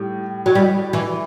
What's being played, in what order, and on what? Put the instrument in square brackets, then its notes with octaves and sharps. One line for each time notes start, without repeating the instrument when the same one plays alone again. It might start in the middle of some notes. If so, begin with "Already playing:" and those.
Already playing: [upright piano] A2 G3
[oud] F#3
G3
E3